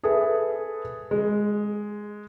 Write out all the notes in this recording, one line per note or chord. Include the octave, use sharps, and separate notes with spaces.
G#4 A4 B4 E5
G#3